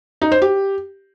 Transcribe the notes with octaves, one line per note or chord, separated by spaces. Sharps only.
D#4
C5
G4